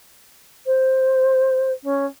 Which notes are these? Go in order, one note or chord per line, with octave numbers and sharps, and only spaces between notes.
C5
C#4